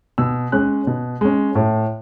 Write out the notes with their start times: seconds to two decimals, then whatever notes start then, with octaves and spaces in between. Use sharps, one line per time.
0.18 B2 E6
0.52 G#3 C#4 F#6
0.87 B2
1.21 G#3 C#4
1.55 A2